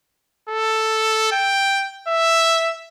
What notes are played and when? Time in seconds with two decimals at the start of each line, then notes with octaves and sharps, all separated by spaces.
0.49 A4
1.32 G5
2.08 E5